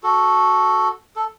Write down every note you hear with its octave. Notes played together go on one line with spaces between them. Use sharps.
F#4 A4
A4